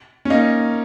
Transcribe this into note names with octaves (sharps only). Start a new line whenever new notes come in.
C#4
A#3 D#4